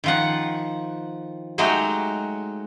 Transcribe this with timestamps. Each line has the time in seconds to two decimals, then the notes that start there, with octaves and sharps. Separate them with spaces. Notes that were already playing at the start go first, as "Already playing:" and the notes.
0.04 D#3 F3 F#5
1.58 F#3 G#3 A3 D#4 F#4 G4